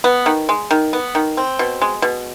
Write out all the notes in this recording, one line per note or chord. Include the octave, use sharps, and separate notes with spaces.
B3
D#3
G#3
D#3
B3
D#3
C4
B2
G#3
B2